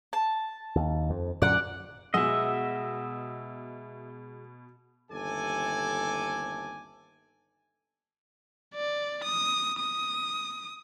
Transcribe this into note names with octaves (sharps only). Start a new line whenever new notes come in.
A5
D#2
F2
F#2 A#2 D3 D5 F#5
B2 G#3 D#5 E5 F#5 E6
G1 D#2 C3 A4 D5 G#5
D5
D#6
D#6